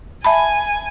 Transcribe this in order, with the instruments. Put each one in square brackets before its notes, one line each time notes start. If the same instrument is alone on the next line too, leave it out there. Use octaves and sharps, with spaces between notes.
[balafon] E5 A5 B5 [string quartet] G#5